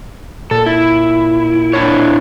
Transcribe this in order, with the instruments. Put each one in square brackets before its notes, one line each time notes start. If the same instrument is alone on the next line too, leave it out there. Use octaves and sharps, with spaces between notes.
[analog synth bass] A#2 [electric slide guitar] A4
[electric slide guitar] E4
D4 E4 C#5